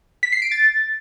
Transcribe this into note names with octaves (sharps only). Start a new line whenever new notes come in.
B6
C7
D7
A6